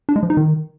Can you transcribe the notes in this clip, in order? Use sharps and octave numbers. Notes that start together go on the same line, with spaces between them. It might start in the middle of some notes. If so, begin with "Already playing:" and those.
D4
G#3
F3
D#4
D#3